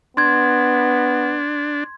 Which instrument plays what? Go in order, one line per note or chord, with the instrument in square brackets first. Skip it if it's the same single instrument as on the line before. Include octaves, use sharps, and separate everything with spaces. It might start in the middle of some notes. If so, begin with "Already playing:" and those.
[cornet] B3 [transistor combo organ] D4 [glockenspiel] C6 G#6